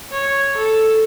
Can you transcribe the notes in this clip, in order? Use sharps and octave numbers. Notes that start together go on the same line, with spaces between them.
C#5
A4